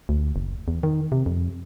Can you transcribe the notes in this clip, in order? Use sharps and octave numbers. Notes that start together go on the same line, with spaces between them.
D2
F#1
E2
D#3
C3
F2